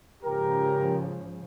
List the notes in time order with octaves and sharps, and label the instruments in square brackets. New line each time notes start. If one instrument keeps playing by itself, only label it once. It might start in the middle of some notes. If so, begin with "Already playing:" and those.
[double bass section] G#2 C#3 F3 [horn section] G4 A#4